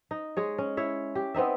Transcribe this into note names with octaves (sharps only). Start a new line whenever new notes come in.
D#4
G#3 G#4 C#5
C#4
E4 C#5 E5
G4
B3 C4 D#4 E5